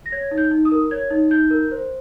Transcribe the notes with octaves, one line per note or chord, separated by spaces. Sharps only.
A#6
C#5 G#6
D#4
G6
D#4
D#6
A#4
C#5 G#6
D#4
D#4 G6
A#4
C5